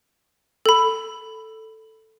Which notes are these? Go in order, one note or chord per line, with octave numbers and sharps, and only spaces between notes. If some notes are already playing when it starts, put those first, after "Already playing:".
A4 B5